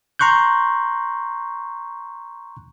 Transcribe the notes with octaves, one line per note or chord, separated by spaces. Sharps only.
A#5 C6 C#6 F#6 G6